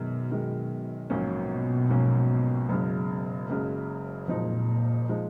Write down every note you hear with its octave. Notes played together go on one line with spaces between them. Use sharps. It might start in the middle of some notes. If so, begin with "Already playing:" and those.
Already playing: F#2 B2 D#3 G#3
F#2 D#3 G#3
A#1 G#2 B2 F#3 A#3 C#4
A#1 G#2 F#3 A#3 C#4
F#1 F#2 C#3 G#3
F#1 F#2 C#3 G#3
F#1 F2 A#2 F3 G#3 D#4
F3 G#3 D#4